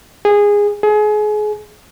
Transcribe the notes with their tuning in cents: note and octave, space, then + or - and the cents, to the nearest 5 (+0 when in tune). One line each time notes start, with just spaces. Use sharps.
G#4 -15
G#4 +30